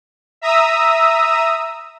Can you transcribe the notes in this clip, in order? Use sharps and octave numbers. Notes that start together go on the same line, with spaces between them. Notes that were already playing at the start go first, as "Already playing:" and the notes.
E5 A#5 D#6 E6